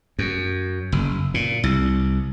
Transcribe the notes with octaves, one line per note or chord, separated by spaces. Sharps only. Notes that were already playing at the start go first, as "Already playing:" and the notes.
F#2
F#1
A#2
C2